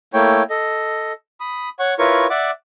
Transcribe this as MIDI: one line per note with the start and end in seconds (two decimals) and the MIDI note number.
0.14 0.43 57
0.14 0.43 58
0.14 0.43 64
0.14 0.43 73
0.14 0.43 79
0.50 1.13 69
0.50 1.13 75
1.40 1.69 83
1.40 1.69 87
1.79 1.94 73
1.79 1.94 78
1.79 1.94 85
1.99 2.27 64
1.99 2.27 65
1.99 2.27 70
1.99 2.27 71
1.99 2.27 73
1.99 2.27 85
2.30 2.51 74
2.30 2.51 76
2.30 2.51 78
2.30 2.51 86